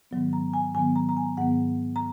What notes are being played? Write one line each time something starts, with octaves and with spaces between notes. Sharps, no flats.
G#2 D#3 F#3 B3
A#5
G#5
G#2 D#3 F#3 B3 G#5
A#5
A#5
G#5
G#2 D#3 F#3 B3 F#5
A#5